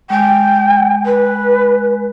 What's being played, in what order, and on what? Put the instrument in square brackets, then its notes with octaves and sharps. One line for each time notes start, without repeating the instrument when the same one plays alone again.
[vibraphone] G#3 G#5 [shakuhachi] G5
[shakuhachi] B4